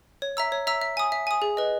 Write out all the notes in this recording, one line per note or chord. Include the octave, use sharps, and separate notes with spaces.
C#5
E5 A#5 E6
C#5
E5 A#5 E6
E5
G#5 D#6
E5
G#5 D#6
G#4
B4 D#5